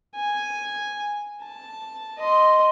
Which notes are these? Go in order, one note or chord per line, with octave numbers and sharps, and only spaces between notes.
G#5
A5
D#5 C6